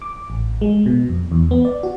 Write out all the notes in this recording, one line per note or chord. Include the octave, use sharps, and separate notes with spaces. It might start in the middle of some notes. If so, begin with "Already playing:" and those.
D6
A1
G#3
B2
F2
E2
B3
D5
F#4